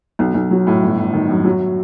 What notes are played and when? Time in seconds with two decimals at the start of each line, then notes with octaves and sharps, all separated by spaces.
0.19 B1
0.34 B1
0.51 F#3
0.67 A2
0.82 G1
0.98 G1
1.13 D#3
1.29 F#2
1.44 F#3